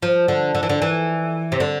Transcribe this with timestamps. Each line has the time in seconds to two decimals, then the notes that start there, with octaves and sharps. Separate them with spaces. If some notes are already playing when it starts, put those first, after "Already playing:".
0.03 F3
0.28 D3
0.55 D3
0.63 E3
0.69 D3
0.82 E3
1.52 C3
1.60 D3